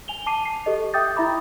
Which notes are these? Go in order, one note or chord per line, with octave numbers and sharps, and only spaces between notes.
G#5 F7 G7
A5 D6 C7 D#7
C7
G4 A4 D#5
E5 G5 D6 D#6 G6 A6
E4 E5 A#5 B5 D6